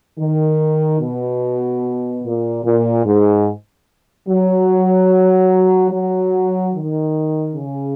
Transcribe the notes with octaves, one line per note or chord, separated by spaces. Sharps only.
D#3
B2
A#2
A#2
G#2
F#3
F#3
D#3
C#3